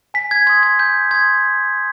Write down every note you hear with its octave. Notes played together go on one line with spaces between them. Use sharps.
G#5 B6
G#6
C6 D#6 G#6
G#6
G#5 G6
C6 D#6 G#6